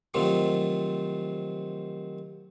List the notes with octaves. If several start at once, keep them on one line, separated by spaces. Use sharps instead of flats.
C3 D#3 F3 F#3 A3